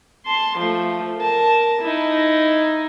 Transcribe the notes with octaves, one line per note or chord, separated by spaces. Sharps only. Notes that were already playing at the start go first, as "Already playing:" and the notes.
A5 C6
F3 A3
A#4 A5
D#4 E4